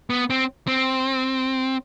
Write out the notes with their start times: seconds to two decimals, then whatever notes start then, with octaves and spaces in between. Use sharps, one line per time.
0.10 B3
0.30 C4
0.67 C4